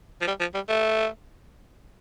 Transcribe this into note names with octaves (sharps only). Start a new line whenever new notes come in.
F3
G3
F3
G3
A3